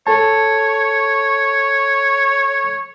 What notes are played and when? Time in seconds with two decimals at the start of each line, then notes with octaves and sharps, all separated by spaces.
0.07 A4 C#5 A5